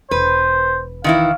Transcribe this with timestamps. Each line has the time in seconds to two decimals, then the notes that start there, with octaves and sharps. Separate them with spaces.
0.11 E1 B4 C5
1.04 D#3 E3 E4 F5